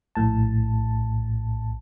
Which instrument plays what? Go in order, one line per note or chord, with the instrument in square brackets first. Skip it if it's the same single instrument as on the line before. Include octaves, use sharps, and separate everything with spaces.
[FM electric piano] A#1 A2 A5